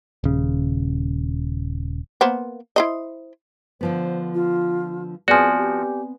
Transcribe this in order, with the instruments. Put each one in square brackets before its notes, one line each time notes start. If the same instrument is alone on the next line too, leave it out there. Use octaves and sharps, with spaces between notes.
[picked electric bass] D#1 C#3
[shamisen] A#3 B3 C5
E4 C5 D#5
[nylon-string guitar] D3 F3 B3 [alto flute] C5
[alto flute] F4
[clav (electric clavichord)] F3 F#4 [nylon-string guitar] B3 C4 [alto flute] G#4 [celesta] D5 G#5
[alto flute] G4